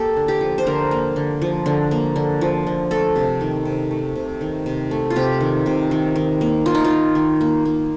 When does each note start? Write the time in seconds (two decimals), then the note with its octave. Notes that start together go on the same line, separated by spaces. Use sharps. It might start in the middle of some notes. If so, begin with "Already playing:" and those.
Already playing: A#3 G4 A4
0.17 D3
0.28 G4
0.41 F3
0.58 C5
0.66 D3 A#4
0.91 A#3
1.16 D3
1.42 F3
1.66 D3
1.91 A#3
2.16 D3
2.41 F3
2.66 D3
2.91 A3 A4
3.16 C3
3.41 D#3
3.65 C3
3.91 A3
4.16 C3
4.41 D#3
4.66 C3
4.91 A3
5.10 F4
5.16 C3 G4
5.41 D#3
5.66 C3
5.91 D#3
6.16 D#3
6.41 A#3
6.66 A#3 F4
6.75 D#4
6.84 F4
6.91 D#3
7.15 D#3
7.41 A#3
7.65 A#3